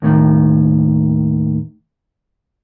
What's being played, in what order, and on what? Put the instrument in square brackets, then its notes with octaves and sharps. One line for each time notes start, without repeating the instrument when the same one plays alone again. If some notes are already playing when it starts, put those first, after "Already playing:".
[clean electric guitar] D#2 A2 D3 D#3